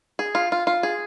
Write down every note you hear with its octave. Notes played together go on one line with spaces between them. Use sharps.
G#4
F4
F4
F4
G#4